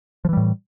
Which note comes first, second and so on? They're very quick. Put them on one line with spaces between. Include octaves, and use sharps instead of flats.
F3 E3 G3 A2